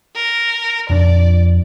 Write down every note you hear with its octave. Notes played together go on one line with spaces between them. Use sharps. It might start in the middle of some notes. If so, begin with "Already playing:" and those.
A#4
F2 D4 D5